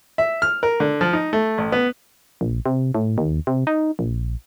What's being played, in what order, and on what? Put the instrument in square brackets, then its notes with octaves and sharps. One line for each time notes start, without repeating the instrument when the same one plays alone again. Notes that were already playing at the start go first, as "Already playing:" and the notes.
[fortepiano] E5
F6
A#4
D3
F3
D#4
A3
A1
B3
[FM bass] A#1
C3
A2
D#2
C3
D#4
A#1